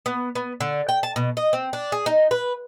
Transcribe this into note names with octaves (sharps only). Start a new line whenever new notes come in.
B3
B3
D3
G5
A5
B2
D#5
C4
D4
G#4
D#4
B4